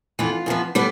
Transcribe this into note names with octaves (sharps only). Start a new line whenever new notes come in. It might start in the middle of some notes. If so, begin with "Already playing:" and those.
F2 E3 B3 F4
E2 C3 F3 B3
D3 G3 B3 G4